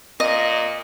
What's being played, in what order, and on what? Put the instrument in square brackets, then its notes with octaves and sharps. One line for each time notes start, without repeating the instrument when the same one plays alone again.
[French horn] A#2 [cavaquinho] D#5